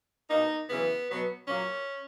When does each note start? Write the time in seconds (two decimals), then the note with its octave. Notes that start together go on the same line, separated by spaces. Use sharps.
0.29 B2 A#3 D#4
0.68 F#2 C#3 E3 B3
1.08 B2 F#3 B3
1.48 A#2 F#3 A#3 C#4